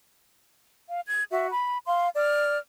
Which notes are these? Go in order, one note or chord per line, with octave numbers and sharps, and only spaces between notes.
F5
G#6
F#4 E5
B5
F5 C6
D5 F6